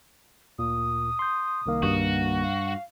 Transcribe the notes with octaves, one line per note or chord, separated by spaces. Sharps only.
D2 A#2 D#6
C6 G6
C2 D#3 A#3
G2 F#4
F5